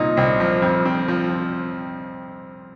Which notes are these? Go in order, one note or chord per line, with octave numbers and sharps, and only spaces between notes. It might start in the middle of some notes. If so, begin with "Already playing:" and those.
Already playing: C2 A#2 D#4
C2
F3
F2
C4
F3